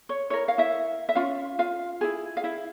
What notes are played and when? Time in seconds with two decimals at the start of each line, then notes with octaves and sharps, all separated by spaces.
0.09 C#5
0.30 E4 A#4 C#5
0.48 F5
0.58 E4 E5
1.09 E5
1.15 C#4 F4 F5
1.59 F4 F5
2.01 E4 G#4
2.37 F5
2.44 E4 E5